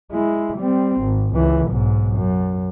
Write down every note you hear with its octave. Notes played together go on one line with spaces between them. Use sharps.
G#3 E4
G3 C4
G#1
C#2 E3
B1 G#2
F#2